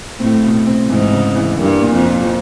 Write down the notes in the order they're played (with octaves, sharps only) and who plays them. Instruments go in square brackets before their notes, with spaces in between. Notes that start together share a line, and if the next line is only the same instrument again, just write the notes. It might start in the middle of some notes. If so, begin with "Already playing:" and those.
[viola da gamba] A2 [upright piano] C4
[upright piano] B2
C4
[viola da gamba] G#2 [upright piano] E3
[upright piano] C#3
E3
[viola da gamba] G2 [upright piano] A#3
[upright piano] A#2
[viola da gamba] F2
[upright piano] A#2